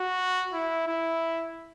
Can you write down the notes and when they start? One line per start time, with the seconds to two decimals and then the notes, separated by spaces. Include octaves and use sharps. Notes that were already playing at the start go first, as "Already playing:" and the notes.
Already playing: F#4
0.53 E4
0.87 E4